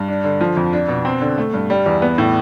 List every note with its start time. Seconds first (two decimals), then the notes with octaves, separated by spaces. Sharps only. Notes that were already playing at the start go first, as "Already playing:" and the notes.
Already playing: G2
0.08 D4
0.24 D3
0.41 F3
0.57 F2
0.73 D4
0.88 B2
1.05 C4
1.21 D3
1.38 A3
1.54 G2
1.70 G3
1.86 E2
2.02 B3
2.18 A2